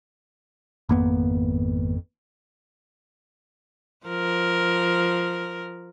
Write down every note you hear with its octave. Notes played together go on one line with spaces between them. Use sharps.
G#1 F2 A#3 B3
F3 A#4